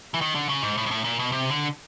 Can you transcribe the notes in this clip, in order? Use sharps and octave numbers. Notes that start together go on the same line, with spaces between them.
E3
D#3
D3
C#3
G#2
A2
G#2
A2
A#2
B2
C3
D3